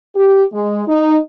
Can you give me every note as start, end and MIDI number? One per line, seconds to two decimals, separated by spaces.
0.15 0.44 67
0.53 0.82 56
0.87 1.17 63